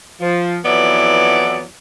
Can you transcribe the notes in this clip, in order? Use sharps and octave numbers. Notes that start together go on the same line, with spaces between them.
F3
F2 E3 F#3 B3 E4 D5